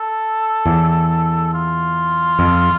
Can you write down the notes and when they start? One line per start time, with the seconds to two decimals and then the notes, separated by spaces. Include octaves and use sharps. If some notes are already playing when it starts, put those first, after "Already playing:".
Already playing: A4
0.66 E2
1.53 F4
2.39 F2